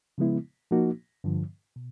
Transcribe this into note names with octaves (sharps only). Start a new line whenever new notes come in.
C#3 F3 G#3 B3 E4
F3 A#3 D#4 F#4
G2 D3 F3
B2